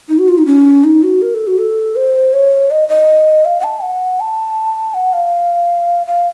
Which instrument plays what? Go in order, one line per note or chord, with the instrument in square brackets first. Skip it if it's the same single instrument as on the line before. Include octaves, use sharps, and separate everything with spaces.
[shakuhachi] D#4
F#4
F4
D#4
C#4
D#4
F#4
A#4
A4
F#4
A4
C5
C#5
D#5
D#5
F5
F#5
A5
F#5
A5
F#5
F5
F5